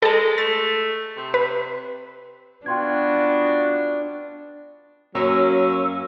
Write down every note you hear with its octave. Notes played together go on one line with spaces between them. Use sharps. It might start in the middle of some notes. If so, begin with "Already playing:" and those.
G#3 A4 A5
A3 A6
C3
B4
B3 D4 F4 F#4 G5 C6 G#6
F#2 F#3 A#3 C#4 E6